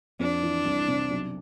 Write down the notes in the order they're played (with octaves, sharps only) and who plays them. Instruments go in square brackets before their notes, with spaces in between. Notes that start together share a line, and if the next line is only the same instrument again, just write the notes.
[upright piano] F2 [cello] D4
[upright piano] E3
C2
C3
B1